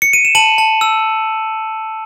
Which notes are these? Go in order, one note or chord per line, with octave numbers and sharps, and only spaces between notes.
C#7
D#7
E7
A5 D#7 F#7
A5
E6